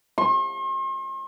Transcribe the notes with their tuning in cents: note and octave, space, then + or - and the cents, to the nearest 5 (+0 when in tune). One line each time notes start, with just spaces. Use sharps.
C6 +45